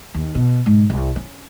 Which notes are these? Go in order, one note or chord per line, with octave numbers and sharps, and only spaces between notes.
D#2
B2
G#2
C2
C#4